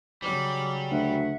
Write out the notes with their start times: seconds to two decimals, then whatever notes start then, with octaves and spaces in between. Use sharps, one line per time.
0.22 C#3 F#3 G3 D6
0.91 D2 E5 F#5